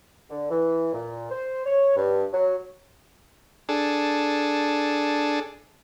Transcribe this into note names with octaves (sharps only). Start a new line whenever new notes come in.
D3
E3
A#2
C5
C#5
G2
F#3
D4 G#4 A4